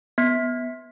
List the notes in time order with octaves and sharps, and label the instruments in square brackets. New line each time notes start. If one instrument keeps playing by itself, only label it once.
[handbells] B3 B6